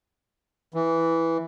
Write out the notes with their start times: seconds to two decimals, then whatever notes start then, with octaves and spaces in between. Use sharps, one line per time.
0.74 E3